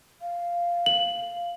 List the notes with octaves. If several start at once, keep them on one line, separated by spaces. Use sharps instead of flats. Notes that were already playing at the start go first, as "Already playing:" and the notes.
F5
F#7